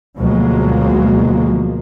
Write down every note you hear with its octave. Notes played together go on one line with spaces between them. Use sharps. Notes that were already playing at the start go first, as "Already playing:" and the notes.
D2 B2 F3 F#3 G#3 A#3